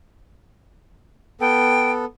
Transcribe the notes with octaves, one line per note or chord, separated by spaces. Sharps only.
B3 A4 G5